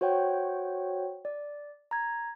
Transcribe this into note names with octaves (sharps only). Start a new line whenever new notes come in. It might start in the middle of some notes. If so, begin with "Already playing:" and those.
F#4 C5 C#5 F#5 G5
D5
A#5 G#6